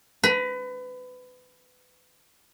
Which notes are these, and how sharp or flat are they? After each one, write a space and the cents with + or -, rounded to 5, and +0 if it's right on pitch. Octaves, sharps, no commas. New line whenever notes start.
B4 +30 B5 -35